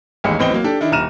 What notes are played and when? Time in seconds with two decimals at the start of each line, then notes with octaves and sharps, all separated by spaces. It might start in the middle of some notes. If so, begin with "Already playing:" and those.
0.24 A1 D#2 G#3 C#7
0.39 A1 B3 C4 D#5 G5 G7
0.51 F#3 A#3
0.64 D4 G4 A4
0.81 D#3 D4 E4
0.92 D#1 A#5 F6 D#7 E7